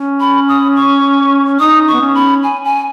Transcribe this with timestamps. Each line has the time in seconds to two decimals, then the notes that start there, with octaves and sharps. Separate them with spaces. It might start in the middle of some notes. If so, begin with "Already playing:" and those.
Already playing: C#4
0.20 B5
0.49 D#6
0.76 C#6
1.60 D#4 D#6
1.88 C#6
1.93 B3
2.01 C#4
2.15 B5
2.43 G#5
2.64 G#5